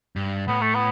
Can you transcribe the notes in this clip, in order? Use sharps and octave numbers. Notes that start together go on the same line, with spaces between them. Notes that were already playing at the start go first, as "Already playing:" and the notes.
G2
A2 B3
A3
B3